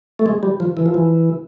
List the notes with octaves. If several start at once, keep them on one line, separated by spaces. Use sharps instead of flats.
A3
G#3
G3
F3
E3
F3
E3